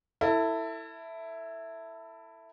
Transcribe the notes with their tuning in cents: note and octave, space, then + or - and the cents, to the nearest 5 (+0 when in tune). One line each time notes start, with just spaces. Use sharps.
E4 +0 A4 +25